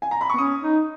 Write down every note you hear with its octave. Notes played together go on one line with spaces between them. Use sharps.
G#5
A#5
B5
C#6
B3
C#4 D#6
D#4